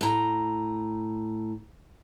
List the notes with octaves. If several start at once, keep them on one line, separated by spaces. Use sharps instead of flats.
A2 A#5